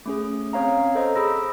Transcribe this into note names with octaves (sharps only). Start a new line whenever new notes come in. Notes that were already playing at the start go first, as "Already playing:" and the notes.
A3 C#4 G#4
C4 C#4 C#5 F5 A#5
A4 C5 D#5 A#5
G#4 B5 E6 A#6